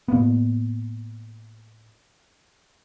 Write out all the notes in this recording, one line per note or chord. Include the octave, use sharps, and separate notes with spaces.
A2 A#3 B3